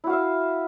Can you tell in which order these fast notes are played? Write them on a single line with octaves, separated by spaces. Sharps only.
E4 F#4 F5 E5